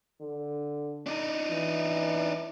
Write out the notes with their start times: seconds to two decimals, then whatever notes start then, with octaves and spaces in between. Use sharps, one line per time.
0.20 D3
1.06 D4 D#4
1.51 E3